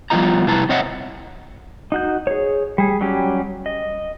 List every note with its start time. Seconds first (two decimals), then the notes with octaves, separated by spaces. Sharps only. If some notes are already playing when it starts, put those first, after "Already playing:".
0.10 F3 G3 B3 F4 D#5 A#5
0.46 C3 E4 B4 A5 A#5
0.69 C4 C#5 D#5 E5 F#5
1.92 D#4 F#4 G6
2.27 G#4 C#5
2.78 G3 G#4
3.01 F#3 G3 C#4 G4
3.66 D#5